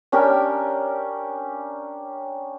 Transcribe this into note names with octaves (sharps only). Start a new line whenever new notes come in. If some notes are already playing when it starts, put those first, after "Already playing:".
C#4 D4 G4 A#4